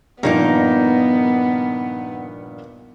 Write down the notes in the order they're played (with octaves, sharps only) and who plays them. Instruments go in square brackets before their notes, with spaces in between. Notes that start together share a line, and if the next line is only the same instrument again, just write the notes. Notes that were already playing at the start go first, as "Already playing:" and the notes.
[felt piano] G2 A#2 F3 [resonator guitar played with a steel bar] D#3 A#3 D#4 [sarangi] B3